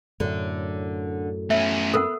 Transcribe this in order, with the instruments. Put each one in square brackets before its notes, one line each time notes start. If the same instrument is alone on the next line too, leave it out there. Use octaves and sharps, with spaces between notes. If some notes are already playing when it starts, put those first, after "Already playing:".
[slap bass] F#2 A2 [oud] D3
[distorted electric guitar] A3 C#4 [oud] B3 [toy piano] E5
[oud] B3 [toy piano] A4 A#4 F#5